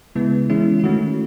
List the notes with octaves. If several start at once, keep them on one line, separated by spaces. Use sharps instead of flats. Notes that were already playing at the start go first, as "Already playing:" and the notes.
C#3 G#3 B3 E4
E3 G#3 C#4 E4
E4
D#3 A3 C#4 F#4